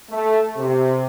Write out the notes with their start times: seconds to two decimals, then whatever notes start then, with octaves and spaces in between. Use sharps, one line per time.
0.10 A3
0.57 C3